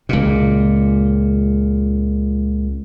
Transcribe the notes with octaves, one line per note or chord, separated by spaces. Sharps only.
C#2 A#2